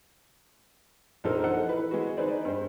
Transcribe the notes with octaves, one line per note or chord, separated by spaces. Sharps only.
A#1 F3 D#4 A4 A#4 C5
D#4 A4 C5 F#5
E3 B4
G#3 B3 F#4
D#4 G#4 B4 C5 D5
G2 C5